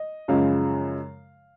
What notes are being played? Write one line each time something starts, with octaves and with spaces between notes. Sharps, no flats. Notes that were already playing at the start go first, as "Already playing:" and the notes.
Already playing: D#5
F#2 C#3 F3 G#3 F5